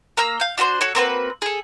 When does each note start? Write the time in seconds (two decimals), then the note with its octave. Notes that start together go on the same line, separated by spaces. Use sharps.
0.17 A#3 A#5 E6
0.40 F5 G6
0.58 D4 F#4 B4 C5
0.81 F#4 A4 C#5
0.95 A#3 C4 F#4 B4
1.42 G#4 A4